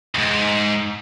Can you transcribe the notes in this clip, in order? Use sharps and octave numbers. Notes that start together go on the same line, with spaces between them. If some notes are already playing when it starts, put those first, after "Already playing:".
C#2 G#2